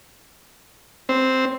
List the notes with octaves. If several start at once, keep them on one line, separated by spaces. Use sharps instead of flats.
C4